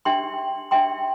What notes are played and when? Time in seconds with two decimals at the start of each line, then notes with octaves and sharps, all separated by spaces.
0.05 D4 G4 E5 G5 C6
0.71 D4 G4 E5 G5 C6